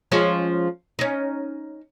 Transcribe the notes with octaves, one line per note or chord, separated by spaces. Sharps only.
F3 G#3 C#4
C#4 D#4